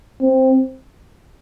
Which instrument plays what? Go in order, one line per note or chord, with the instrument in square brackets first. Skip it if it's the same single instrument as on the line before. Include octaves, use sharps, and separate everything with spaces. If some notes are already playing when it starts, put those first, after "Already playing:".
[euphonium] C4